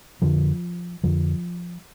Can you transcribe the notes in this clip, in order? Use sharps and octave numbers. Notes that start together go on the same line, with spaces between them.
F2 D3 F3
F2 D3 F3